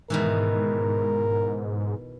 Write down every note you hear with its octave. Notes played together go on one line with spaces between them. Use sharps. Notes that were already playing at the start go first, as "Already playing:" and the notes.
G#2 B2 D#3 E3 A#4